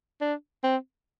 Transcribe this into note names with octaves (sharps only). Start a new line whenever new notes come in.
D4
C4